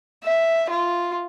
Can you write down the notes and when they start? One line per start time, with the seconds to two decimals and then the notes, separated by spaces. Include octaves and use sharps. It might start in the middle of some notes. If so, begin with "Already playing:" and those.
0.24 E5
0.70 F4